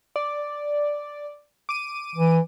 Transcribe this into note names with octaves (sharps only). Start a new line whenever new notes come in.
D5
D6 D#7
E3